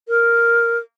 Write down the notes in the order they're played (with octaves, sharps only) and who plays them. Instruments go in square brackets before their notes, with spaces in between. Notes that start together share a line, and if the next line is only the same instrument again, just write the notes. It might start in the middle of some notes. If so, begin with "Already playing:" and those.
[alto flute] A#4